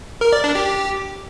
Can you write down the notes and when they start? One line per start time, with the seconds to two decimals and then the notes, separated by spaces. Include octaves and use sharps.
0.21 A#4
0.33 D5
0.44 D4
0.55 G4